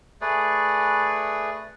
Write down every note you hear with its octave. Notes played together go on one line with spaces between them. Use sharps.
A3 G#4 B4 D5